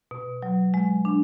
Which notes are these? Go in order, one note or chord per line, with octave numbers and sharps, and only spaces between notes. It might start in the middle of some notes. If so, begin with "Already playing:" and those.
B2
F#3
G#3
D4